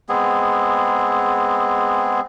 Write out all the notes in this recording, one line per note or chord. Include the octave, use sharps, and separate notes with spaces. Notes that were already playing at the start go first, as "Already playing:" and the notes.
G#3 B3 C4 G#4